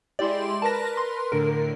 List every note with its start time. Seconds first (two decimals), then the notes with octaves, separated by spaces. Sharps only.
0.19 G#3 E4 G4 D5 C6
0.62 A#4 B4 A5 A#6
0.97 C6
1.32 A2 D3 A#4